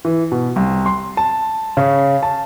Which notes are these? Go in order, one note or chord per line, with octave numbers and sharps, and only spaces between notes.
E3
B2
C2
C6
A5
C#3
A5